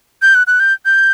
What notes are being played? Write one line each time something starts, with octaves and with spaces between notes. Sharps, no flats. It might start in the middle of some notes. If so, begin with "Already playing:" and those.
G6
F#6
F#6
G6
G6